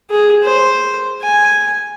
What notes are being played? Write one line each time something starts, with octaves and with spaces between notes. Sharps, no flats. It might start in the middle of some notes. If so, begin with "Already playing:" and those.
G#4
C5
G#5